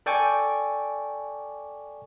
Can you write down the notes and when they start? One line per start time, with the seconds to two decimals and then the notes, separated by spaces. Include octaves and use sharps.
0.06 A4 D5 G5 G#5 C#6 D6